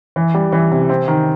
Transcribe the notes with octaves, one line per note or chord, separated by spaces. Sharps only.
E3
G3
E3
C3
C4
D#3